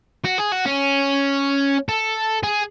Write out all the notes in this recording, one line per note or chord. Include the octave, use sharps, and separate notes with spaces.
F#4
G#4
F#4
C#4
A4
G#4